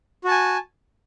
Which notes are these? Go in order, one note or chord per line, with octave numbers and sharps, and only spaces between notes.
F#4 G#5 A5